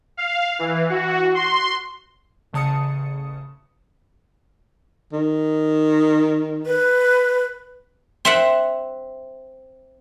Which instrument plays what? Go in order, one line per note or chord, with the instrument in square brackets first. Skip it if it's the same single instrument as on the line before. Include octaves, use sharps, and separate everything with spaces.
[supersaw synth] F5
E3
F#4
C6
[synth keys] A1 C#3 A5 D#6 C#7
[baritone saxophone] D#3
[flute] B4
[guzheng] C4 E5 F#5